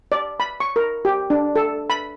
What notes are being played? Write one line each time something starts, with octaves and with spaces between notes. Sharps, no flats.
D5
B5
C#6
A#4
G4
D4
A4
B5